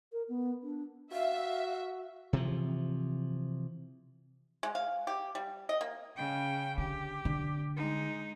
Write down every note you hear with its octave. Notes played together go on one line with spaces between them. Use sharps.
A#4
B3
D4
F#4 E5 F5
C3 E3 F3
G#3
F5
G4
G3
D#5
A#3
C#3 G5
D3 G4
D3
G#3 D#4